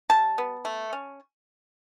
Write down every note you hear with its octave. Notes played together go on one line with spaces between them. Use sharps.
G3 A5
B3
A3
C#4